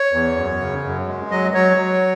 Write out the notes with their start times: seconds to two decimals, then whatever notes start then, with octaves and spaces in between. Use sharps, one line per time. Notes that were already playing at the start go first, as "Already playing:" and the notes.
Already playing: C#5
0.13 E2
0.36 F#2
0.60 C#3
0.84 F#2
1.07 G#3
1.31 F#3 D#5
1.53 F#3 C#5
1.77 F#3